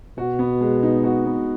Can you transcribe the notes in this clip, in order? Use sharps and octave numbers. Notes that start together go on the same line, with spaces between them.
B2 F#4
B3
G#3
D#4
F#4
B3